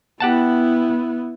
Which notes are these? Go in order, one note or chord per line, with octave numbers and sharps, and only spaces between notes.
B3 E4 G4 F#5 A5